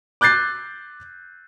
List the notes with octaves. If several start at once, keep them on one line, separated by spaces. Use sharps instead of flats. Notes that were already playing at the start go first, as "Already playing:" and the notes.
D6 F#6 G6 A6 C7